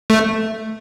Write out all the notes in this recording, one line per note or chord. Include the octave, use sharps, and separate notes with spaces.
A3